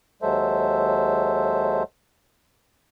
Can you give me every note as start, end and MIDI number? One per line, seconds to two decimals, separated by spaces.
0.22 1.83 39
0.22 1.83 54
0.22 1.83 56
0.22 1.83 69
0.22 1.83 72
0.22 1.83 76